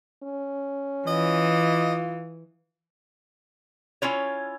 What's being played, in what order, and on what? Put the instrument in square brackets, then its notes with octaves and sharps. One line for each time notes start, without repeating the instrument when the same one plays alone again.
[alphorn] C#4
[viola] E3 [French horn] F4 [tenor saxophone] D#5
[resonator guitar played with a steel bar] C#4 E4 F4 C#5